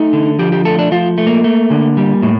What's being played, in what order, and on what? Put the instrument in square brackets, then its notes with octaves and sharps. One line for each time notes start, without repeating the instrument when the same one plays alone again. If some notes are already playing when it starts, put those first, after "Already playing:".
Already playing: [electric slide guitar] A3 D#4
D3
F3 G4
G4
A3 A4
D4
F3 F4
A3
A#3
A3
D3
G3
A2